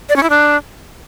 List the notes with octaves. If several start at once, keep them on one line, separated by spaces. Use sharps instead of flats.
D5
C#4
E4
D4